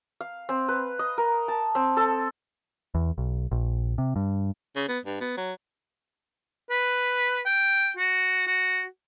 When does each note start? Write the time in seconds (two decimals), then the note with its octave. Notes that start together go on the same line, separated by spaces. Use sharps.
0.21 F5
0.49 C4
0.69 B4
0.99 D#5
1.18 A#4
1.48 A5
1.75 C4
1.97 A4
2.95 E2
3.18 B1
3.52 A#1
3.98 C3
4.16 G2
4.76 C#3
4.88 B3
5.05 G2
5.21 B3
5.37 F#3
6.70 B4
7.46 G5
7.97 F#4
8.47 F#4